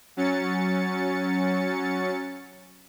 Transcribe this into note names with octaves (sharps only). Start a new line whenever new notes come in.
F#3 C#4 A6 C#7